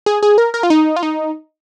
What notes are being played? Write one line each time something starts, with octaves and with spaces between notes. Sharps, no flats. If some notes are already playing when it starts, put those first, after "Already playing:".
G#4
G#4
A#4
A#4
F4
D#4
F4
D#4